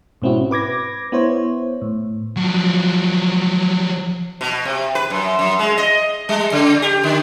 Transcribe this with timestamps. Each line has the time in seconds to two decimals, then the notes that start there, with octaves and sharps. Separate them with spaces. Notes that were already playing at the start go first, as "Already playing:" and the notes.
0.22 G#2 B2 C4 C#4 E4 F#4
0.51 B4 D6 G#6 A#6
1.12 B3 E4 C5 C#5
1.82 A2
2.36 F3 F#3
4.41 B2
4.65 C3
4.95 B4
5.10 F#2
5.39 F#2
5.59 G#3
5.78 D#5
6.29 G3
6.52 C#3
6.82 G4
7.03 D3